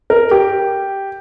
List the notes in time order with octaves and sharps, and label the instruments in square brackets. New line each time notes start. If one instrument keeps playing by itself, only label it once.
[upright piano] A#4
G4